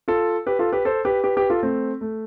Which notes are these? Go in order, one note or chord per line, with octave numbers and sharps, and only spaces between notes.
F4 A4
G4 B4
F4 A4
G4 B4
A4 C5
G4 B4
G4 B4
G4 B4
F4 A4
A3 C4
A3